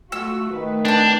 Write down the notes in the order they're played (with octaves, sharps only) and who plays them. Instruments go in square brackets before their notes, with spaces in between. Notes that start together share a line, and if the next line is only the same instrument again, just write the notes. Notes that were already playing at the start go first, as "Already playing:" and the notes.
[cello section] A3 F4 F#4 [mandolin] E6
[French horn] D#3 [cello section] A3 B4
[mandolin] C4 A5 [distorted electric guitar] D4